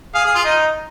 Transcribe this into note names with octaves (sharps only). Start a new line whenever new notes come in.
G#4 F5
G#4
F4
D#4 D#5